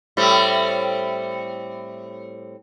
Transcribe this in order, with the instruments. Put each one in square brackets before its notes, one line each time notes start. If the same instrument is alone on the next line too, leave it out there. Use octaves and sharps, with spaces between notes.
[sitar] A2 G3 C4